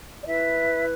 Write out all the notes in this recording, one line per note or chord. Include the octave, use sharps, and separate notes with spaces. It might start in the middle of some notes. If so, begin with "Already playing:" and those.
D5
E4 B4 E5